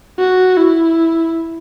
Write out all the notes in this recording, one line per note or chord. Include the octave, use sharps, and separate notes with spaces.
F#4
E4